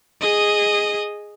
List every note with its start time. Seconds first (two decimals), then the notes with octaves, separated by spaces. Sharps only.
0.21 G#4 D#5